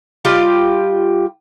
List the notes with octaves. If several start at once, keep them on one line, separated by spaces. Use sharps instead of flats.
G3 F4 G4 D#5